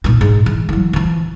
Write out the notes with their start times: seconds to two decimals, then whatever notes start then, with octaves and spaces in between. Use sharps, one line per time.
0.04 A#2 D#4
0.21 G#2
0.46 E3
0.69 E3 F#3
0.93 E3 F3